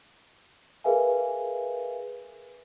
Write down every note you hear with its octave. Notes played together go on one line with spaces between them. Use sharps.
G#4 A#4 B4 E5 F5 G#5